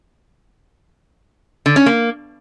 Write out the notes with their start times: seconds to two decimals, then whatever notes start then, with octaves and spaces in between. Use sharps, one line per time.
1.66 D3
1.76 C#4
1.86 A#3